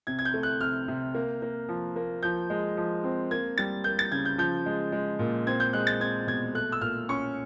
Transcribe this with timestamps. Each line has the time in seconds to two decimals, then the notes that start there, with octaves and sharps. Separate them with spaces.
0.07 C3 G#6
0.19 G#6
0.25 G6
0.34 A3
0.43 F#6
0.61 C3 F6
0.88 C3
1.15 A#3
1.42 A#3
1.69 F3
1.96 A#3
2.23 F3 G6
2.50 G#3
2.77 F3
3.04 C4
3.31 A#3 G#6
3.58 G3 A6
3.84 A#3 G6
3.99 A6
4.12 C#3 G#6
4.25 G6
4.38 F3 G6
4.66 G#3
4.92 G#3
5.19 A#2
5.47 C4 G#6
5.60 G6
5.73 G#3 F#6
5.87 A6
6.01 C4 G#6
6.27 B2 G#6
6.55 A3 F#6
6.72 E6
6.81 A#2 F6
7.09 C#4 C#6